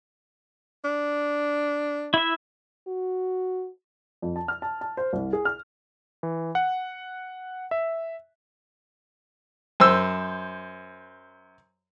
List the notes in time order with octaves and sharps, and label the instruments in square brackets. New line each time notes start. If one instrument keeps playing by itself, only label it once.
[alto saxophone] D4
[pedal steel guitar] E4 E5
[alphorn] F#4
[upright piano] F2
A5
F6
A5
A5
C5
C2
G#4
F6
[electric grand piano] E3
F#5
E5
[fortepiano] F#2 C5 E6